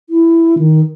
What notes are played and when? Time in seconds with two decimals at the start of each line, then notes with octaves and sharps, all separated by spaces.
0.10 E4
0.59 D#3